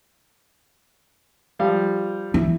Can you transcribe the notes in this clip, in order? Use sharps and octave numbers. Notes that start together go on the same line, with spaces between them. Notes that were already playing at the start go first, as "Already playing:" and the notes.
F3 G3 F5
E3